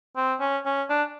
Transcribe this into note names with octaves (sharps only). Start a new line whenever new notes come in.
C4
C#4
C#4
D4